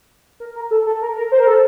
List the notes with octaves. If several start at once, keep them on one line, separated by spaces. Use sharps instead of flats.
A#4
A#4
A4
A4
A#4
A#4
C5
A#4
A4